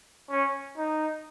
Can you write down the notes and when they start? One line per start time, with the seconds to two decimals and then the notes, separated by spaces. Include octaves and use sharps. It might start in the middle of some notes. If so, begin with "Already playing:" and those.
0.30 C#4
0.78 D#4